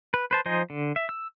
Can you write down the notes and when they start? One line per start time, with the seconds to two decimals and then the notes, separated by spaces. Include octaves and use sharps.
0.14 B4
0.31 B4 C5 A5
0.46 F3 D#4 C5 D#5 G#5
0.70 D3
0.96 E5
1.09 E6